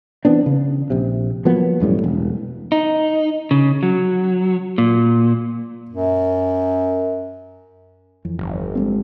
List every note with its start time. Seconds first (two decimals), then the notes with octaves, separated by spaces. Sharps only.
0.25 E3 B3 C4 D4
0.46 C#3
0.90 A#1 C3
1.45 F3 F#3 A#3 B3
1.80 E1 F#2 A2 G3
2.03 E1 C2
2.72 D#4
3.51 C#3
3.83 F#3
4.78 A#2
5.89 F#2
8.25 F2 E3
8.39 G1
8.75 G#3 B3 C4